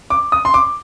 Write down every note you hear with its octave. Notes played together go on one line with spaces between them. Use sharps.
D6
D#6
C6
D6